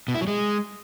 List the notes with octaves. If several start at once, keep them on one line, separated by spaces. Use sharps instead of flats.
B2
E4
F#3
G#3